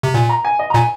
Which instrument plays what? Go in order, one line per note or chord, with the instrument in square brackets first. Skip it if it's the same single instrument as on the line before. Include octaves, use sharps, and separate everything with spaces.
[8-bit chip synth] C3
[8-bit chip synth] A#2 [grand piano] G#5
[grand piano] A#5
G#5
D#5
A#5
[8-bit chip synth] A#2 [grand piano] G#5